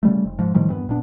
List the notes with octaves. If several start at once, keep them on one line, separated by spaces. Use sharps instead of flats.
C#3 G3 A3
F1
G#2 F3
A2 D#3 F3 G3
E2 G2 B3
F1 A#2 B3 D4